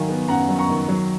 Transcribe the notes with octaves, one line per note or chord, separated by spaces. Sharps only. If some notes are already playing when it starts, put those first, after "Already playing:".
Already playing: D#3 F#3 F5 G#5
B3
F#2 F#5 A#5
F#3
A#5 C#6
D#3
F#3